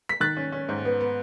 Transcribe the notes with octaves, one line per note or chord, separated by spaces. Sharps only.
B6
D#3 F#6 A6
C#4
C#4
G#2
B3
B3